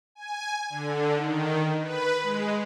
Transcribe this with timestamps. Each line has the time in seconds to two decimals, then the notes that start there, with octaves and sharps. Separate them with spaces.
0.15 G#5
0.70 D3
1.15 D#3
1.81 B4
2.22 G#3